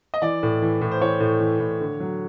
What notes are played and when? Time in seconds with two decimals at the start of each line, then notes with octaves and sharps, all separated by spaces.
0.14 D#5
0.22 E3 D5
0.43 A2
0.62 E3
0.81 A2
0.91 C5
1.01 E3 C#5
1.20 A2
1.40 E3
1.60 A2
1.81 D3
2.00 F#3